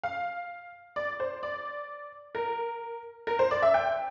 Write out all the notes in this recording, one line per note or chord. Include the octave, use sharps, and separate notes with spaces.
F5
D5
C5
D5
A#4
A#4
C5
D5
E5
G5